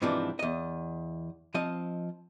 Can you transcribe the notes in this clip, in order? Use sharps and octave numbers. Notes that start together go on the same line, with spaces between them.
G#2 C3 E3 F3 C4 D4
E2 D#5
F3 C4 D#5